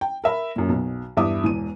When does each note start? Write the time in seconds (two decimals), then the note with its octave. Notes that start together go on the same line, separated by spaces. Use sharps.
0.01 G5
0.24 A#4 E5 B5
0.56 F#2 A#2
0.69 B1 B2
1.17 E2 G2 E5 D6 D#6
1.44 E1 E2 D#7